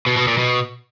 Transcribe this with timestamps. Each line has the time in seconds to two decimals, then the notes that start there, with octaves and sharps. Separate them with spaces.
0.07 B2
0.17 B2
0.28 A#2
0.38 B2